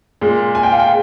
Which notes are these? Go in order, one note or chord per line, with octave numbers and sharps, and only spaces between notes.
A#2 G#3
G#5
G5
F5
G5